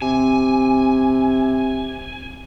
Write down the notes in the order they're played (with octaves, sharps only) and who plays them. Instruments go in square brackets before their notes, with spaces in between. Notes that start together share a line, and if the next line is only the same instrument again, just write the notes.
[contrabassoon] C3 [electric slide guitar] G#5